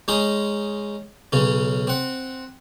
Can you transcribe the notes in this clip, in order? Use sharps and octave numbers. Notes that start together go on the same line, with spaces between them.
G#3 C#4 D#4 G#4
B1 C#3 C#4
C4 F#5